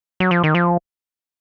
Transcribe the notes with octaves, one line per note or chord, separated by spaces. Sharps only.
F#3
F3
D#3
F3